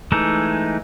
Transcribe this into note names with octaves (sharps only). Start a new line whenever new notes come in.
E3 G#3 A3 D#4